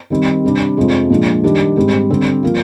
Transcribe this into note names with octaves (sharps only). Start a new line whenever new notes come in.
D#3 G3 C4
C3 G3 D4
F2 C3 F3 G#3
A#2 F3 G#3 D4
D#3 G3 D4 G4
G#2 G3 C4 G4
D3 G3 C4 G4
F3 A#3 F4